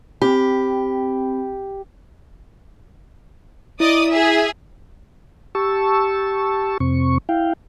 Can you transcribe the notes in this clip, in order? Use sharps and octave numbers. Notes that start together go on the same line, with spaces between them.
C4 G4 B5
E4 D5 D#5 D#6
G#4 E5
G4 A5 C#6 E6
F2 C3 C4 C#6
E4 F5 G5